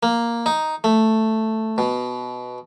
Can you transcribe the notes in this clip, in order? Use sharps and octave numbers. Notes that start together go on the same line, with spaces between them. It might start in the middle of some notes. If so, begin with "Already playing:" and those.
A#3
D#4
A3
B2